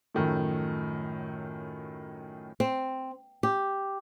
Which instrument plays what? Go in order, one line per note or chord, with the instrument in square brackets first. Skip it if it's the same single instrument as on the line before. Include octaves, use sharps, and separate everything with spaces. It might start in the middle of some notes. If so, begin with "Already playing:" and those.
[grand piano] F#2 A2 D#3 F3 A3
[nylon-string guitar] C4
G4